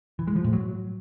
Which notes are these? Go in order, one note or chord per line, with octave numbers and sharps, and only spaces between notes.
E3
G#3
F3
A2
F#3